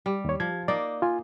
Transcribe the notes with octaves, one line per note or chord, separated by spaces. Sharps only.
G3
D#2 C#5
F3 G#6
A#3 D#4 D5
F4 G#5